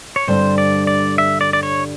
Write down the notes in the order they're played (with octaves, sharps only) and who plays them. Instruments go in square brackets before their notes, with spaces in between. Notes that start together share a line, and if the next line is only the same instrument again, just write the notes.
[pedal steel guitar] C#5
[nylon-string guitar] G2 D3 G3 C4 [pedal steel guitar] C5
[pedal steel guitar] D5
D5
E5
D5
D5
C#5